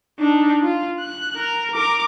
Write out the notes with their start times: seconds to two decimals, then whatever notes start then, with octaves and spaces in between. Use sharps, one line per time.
0.19 D4 D#4
0.63 F4
1.00 F#6
1.37 A#4
1.74 A#4 D6